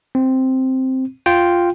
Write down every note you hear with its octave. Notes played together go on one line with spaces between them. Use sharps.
C4
F4 G5